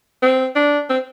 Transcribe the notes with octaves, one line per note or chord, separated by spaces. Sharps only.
C4
D4
C4